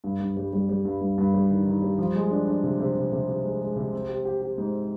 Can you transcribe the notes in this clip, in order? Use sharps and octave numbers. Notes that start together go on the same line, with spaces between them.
G2
G2
G3
G3
G3
G2
G2
G2
G3
D#3
D#3
G3
F3
G#3
D4
D4
C3
C3
C3
C3
C3
G#3
G#3
C3
C4
G4
G4
G4
G#2